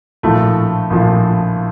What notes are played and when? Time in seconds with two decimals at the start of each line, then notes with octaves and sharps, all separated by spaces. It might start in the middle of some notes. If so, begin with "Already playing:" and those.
0.23 A#1 A2 F3 A3
0.90 A#1 A2 F3